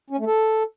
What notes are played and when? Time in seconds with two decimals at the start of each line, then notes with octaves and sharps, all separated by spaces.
0.10 C#4
0.18 A3
0.26 A4